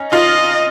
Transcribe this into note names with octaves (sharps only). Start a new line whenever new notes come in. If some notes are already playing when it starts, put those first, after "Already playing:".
Already playing: C#4 D#4
D#4 F4 D#5